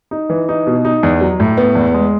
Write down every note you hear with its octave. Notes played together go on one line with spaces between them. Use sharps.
D#4
E3
D#4
B2
D#4
E2
F#3
A2
B3
E2
G#3